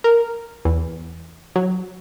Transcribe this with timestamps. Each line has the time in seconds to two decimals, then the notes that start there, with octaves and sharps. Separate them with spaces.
0.04 A#4
0.65 E2
1.56 F#3